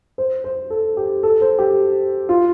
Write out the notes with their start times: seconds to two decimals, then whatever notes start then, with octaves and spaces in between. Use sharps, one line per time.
0.18 C5
0.44 C5
0.70 A4
0.97 G4
1.23 A4
1.41 C5
1.59 G4
2.29 F4